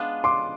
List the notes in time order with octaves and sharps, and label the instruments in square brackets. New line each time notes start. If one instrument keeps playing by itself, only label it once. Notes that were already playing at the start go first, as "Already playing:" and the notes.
Already playing: [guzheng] G#3 B3 D4 F4
[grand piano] C6 D6